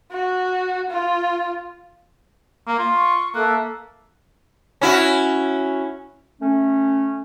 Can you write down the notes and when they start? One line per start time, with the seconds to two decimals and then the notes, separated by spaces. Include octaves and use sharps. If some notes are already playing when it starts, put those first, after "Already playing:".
0.12 F#4
0.90 F4
2.67 A#3
2.79 F4
2.94 C#6
3.34 A#3 A4 E5 F#6
4.81 C#4 E4 F#4
6.41 A3 C#4